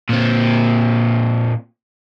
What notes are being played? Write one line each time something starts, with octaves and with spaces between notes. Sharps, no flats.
A#2 C4